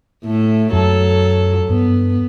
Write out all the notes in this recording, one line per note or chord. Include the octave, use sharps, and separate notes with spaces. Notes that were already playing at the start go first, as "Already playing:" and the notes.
A2 A3
F#2 F#3 A4
G2 B3